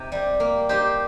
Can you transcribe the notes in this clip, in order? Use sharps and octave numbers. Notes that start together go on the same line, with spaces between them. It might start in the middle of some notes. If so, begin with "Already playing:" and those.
Already playing: C3 D#4
G3 C4
A#3
D#4 G4 C5